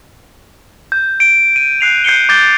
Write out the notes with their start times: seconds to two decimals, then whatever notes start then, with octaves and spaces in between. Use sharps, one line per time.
0.92 G6
1.20 D7
1.56 D#7
1.81 F#6 C7 F7
2.04 G6 C7 C#7 G7
2.29 D6 G6 A6 G7